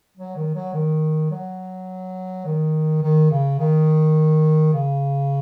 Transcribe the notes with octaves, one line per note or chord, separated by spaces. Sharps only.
F#3
D#3
F#3
D#3
F#3
D#3
D#3
C#3
D#3
C#3